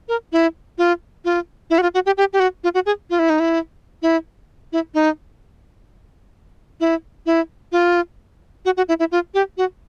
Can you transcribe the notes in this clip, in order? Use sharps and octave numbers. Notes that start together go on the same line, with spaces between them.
A#4
E4
F4
F4
E4
F#4
F4
F#4
G4
G4
G4
F#4
F4
F#4
G#4
F4
E4
D#4
E4
E4
E4
D#4
E4
E4
F4
F#4
F#4
E4
E4
F4
G4
F#4